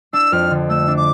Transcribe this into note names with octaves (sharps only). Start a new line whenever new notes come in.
D4 E6
F2 F6
D3
A3 E6
D4
D6